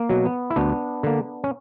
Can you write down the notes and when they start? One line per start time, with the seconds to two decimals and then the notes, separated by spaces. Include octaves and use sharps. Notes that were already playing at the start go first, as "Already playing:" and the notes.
Already playing: A#3
0.09 B2 F#3
0.25 B3
0.50 E4
0.56 D2 B3 D4
1.03 D3 A#3
1.44 C#4